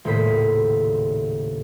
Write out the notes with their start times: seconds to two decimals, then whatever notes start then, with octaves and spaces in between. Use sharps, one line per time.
0.05 D#1 A2 C#3 C5 B6